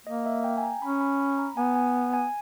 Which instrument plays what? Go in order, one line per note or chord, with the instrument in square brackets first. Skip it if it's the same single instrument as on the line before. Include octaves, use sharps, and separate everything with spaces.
[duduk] A#3 [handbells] D#5
[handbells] E5
G5
G#5
A#5
[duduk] C#4 [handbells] B5
[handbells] B5
B5
A#5
[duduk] B3 [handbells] G#5
[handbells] G#5
G#5